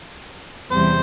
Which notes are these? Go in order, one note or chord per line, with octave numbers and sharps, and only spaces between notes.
E2 C3 E3 G3 C5